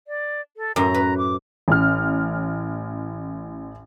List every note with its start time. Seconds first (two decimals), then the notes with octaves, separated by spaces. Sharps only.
0.08 D5
0.57 A4
0.76 F#2 A2 A#5
0.94 B4
1.18 D6
1.68 A1 C#4 F6